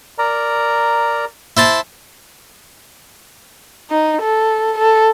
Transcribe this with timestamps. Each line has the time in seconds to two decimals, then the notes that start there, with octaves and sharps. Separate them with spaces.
0.18 A#4 D5 A#5
1.57 E4 C5 A5
3.90 D#4
4.21 A4
4.78 A4